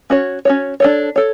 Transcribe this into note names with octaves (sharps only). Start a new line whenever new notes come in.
C#4 F#4 C#5
C#4 F#4 C#5
D4 A4 C#5
A4 C#5